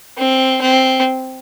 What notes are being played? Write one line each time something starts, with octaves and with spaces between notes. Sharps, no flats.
C4
C4